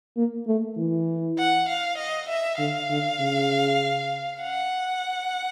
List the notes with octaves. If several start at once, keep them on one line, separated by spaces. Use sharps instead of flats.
A#3
A3
E3
F#5
F5
D#5
E5
D3 F5
D3
C#3
F#5